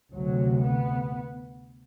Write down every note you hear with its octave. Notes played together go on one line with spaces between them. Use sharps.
D2 C3 F#3
B3